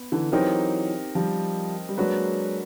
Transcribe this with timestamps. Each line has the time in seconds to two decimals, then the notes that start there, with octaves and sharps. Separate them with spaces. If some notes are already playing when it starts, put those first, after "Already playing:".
Already playing: B3
0.12 D3 E3
0.32 E3 F#3 C4 D#4 G4 A#4
1.15 F3 G3
1.89 G3
1.98 F#3 G#3 A#3 D4 F#4 B4